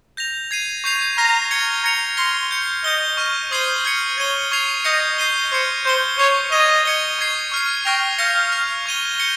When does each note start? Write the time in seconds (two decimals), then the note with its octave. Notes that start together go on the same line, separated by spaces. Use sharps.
0.17 G6 A#6 F7
0.51 G#6 C7 D#7
0.84 C#6 G6 C7 F7
1.18 A#5 F6 A#6 D#7
1.51 G#6 C#7 G7
1.84 A#5 G#6 C#7 F7
2.17 C6 F6 A#6 C#7 G7
2.51 G6 C#7 F7
2.84 D#5 G6 C#7 G7
3.17 C#6 F6 A#6 D#7
3.51 C5 D#6 G#6 C7 D#7 G7
3.85 F6 G#6 C#7
4.18 C#5 G#6 D#7 G7
4.51 C#6 G#6 C7 F7
4.84 D#5 G6 A#6 C#7
5.18 G6 C7 D#7 G7
5.52 C5 F6 G#6 C#7
5.84 C5 G6 C#7 G7
6.18 C#5 C#6 G6 C7 F7
6.52 D#5 C#6 G#6 D#7 G7
6.85 G#6 C#7 G7
7.19 C#6 G#6 C7
7.52 C#6 F6 C7
7.85 G5 C#6 F6 A#6 F7
8.18 F5 G6 A#6 C#7 F7
8.52 F6 A#6 F7
8.86 C#6 G#6 D#7 G7
9.18 G6 C#7 G7